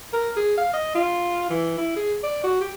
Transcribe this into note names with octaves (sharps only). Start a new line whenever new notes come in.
A#4
G#4
F5
D#5
F4
E3
E4
G#4
D5
F#4
G4